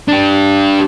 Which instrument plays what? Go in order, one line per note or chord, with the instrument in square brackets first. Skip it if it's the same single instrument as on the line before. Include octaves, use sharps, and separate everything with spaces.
[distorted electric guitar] D4 G4